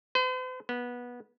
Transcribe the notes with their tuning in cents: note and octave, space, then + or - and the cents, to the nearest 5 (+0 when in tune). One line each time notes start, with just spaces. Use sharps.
C5 -45
B3 -20